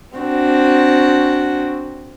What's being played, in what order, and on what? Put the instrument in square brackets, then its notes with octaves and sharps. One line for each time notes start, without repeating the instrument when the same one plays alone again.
[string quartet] C4 D4 F#4